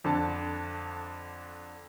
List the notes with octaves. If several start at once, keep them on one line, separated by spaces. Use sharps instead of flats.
F2 D3 A5